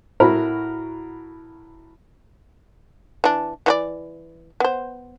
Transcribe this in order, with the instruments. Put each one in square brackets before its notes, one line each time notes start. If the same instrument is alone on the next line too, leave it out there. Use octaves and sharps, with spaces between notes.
[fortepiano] A2 F#4 A#4 B5
[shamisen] E3 D4
E3 F#4 D5
B3 C5